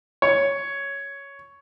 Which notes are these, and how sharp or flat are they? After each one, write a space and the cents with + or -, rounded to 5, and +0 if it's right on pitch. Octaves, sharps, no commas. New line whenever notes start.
C#5 +5